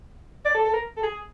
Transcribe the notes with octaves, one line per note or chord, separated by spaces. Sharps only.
D5
A4
A4
A#4
A4
G#4